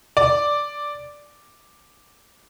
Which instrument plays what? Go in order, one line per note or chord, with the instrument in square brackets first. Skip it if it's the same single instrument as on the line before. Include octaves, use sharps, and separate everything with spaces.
[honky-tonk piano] D5